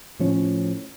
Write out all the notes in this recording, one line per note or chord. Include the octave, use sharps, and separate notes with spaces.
A2 F3 C#4